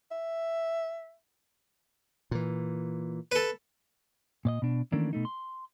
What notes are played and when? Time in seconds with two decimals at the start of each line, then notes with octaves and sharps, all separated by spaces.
0.11 E5
2.31 A#2 E3
3.32 A4 B4
4.45 A#2 D5 D#5
4.62 B2 D4
4.92 D#3 E3 A3 A#3 C#4 D4
5.13 B2 A3 D#4
5.25 C6